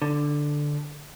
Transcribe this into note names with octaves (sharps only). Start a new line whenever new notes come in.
D3